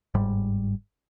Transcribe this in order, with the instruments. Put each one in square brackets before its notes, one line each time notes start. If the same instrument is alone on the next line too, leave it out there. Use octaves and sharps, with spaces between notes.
[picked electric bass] G1 G#2 G3